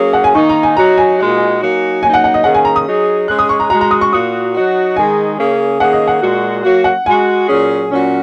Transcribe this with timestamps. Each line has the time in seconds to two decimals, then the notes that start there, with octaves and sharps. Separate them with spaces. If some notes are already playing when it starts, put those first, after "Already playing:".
Already playing: F#3 A#3 C#4 G#4
0.13 F#5
0.24 G#5
0.35 D#3 A#3 D#4 C#6
0.49 A#5
0.63 G#5
0.77 F#3 D#4 F#4 A#5
0.98 G#5
1.18 A#2 G#3 D#4 F#4
1.61 F#3 A#3 D#4 F#4
2.02 F#3 A#3 D#4 G#5
2.14 F#5
2.24 F#5
2.34 D#5
2.44 D#3 A#3 C#4 G#4 F#5
2.55 G#5
2.65 A#5
2.76 D#6
2.86 F#3 D#4 G#4
3.28 G#3 C#4 G#4 F#6
3.39 D#6
3.49 C#6
3.60 A#5
3.70 G#3 F#4 A#5
3.81 A#5
3.91 D#6
4.01 C#6
4.12 A#2 A#3 F#4 D#6
4.55 F#3 D#4 F#4
4.96 D#3 G#3 D#4 G#4 G#5
5.37 C#3 A#3 C#4 G#4
5.79 D#3 A#3 C#4 G#4 F#5
5.93 D#5
6.08 F#5
6.21 A#2 G#3 F#4
6.63 F#3 A#3 F#4
6.84 F#5
7.06 G#3 F#4 G#5
7.48 A#2 F#3 C#4 G#4
7.90 A#2 F#3 C#4 F#4